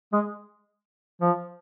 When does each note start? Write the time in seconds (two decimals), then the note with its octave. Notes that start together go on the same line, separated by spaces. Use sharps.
0.13 G#3
1.21 F3